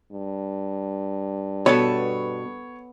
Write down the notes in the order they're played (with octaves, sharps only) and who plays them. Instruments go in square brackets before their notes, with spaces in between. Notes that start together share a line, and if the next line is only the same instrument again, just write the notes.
[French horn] G2
[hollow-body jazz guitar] B2 [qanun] B3 A4 A5 [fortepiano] C#5